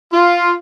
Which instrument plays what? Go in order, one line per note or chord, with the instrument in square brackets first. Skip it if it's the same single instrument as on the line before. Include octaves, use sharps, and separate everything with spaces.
[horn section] F4